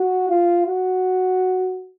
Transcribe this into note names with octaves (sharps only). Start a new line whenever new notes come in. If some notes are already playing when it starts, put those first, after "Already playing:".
Already playing: F#4
F4
F#4